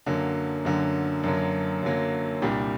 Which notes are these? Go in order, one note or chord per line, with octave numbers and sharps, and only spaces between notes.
F#2 D3 F#3 A#3
F#2 D3 F#3 A#3
F#2 D3 F#3 A#3
F#2 D3 F#3 A#3
C2 A#2 G3 D4 G4